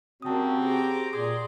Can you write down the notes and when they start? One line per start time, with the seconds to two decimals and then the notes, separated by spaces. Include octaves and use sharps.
0.22 C#3 G3 A#3 C4 F#4 A5 D#6
0.62 G4 G#4 C5 A#5 D6
1.13 A#2 G#4 D5 C6 D#6